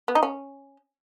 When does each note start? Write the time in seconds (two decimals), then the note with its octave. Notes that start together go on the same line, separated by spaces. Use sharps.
0.08 B3
0.15 D#4
0.23 C#4